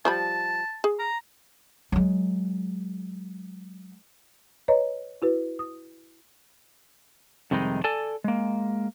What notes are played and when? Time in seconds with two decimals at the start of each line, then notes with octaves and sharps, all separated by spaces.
0.05 F3 G3 A5 B5
0.84 G#4
0.99 A#5
1.92 F#3 G#3
4.68 B4 C#5 D#5 A#5
5.22 E4 F#4 B4
5.59 D#6
7.51 F2 C3 D#3 G3 G#3 D#4
7.84 A4 D5 G#5 A5
8.24 G#3 A#3